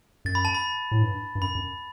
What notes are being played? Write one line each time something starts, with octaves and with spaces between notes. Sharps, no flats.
F#2 A6
B5
A5
B5
A2
G2
G2
F#2 B5
F#2